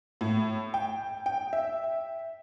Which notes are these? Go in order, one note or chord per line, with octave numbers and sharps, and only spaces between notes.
A2
G5
G5
E5